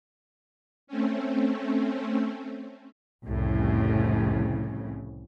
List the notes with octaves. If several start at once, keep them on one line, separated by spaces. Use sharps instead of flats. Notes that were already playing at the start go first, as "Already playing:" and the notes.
A3 C4 C#4
C2 F2 A2 C#3